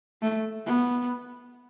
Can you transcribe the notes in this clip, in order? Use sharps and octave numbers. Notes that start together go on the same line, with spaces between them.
A3
B3